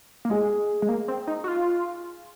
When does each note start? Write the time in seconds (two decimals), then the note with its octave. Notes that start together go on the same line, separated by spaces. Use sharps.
0.25 A#3
0.30 G#3 G#4
0.82 G#3
0.89 A#3
1.08 C4
1.28 D#4
1.44 F#4
1.48 F4